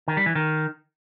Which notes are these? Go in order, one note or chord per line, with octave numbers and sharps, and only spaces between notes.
D#3
G3
E3
D#3